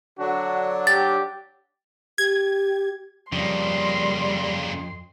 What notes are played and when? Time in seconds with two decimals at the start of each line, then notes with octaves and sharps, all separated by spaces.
0.19 D3 F#3 D4 F#4
0.87 G4 A6
2.18 G4 G#6
3.33 F2 C#3 G3 A#3 C6